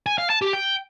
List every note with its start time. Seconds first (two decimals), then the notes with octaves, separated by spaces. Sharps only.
0.06 G#5
0.18 F5
0.30 A5
0.42 G4
0.53 G5